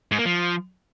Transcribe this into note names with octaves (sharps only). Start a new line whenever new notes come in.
G#2
A#3
F3